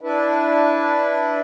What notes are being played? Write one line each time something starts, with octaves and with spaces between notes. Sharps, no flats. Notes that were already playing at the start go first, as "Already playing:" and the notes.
D4 E4 B4